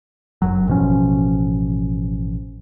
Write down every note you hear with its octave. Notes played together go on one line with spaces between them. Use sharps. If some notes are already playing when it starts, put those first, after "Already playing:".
G1 F#2 F#3
A1 B2 F3 C#4